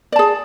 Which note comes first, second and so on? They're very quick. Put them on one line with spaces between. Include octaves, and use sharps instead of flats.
D5 A5 G#4